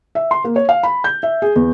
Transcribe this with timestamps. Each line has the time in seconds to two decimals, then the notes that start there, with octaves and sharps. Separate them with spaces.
0.15 E5
0.31 C6
0.44 A#3
0.56 C#5
0.69 F5
0.83 B5
1.04 G6
1.23 E5
1.42 G#4
1.56 E2